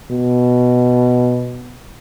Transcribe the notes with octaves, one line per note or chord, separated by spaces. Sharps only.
B2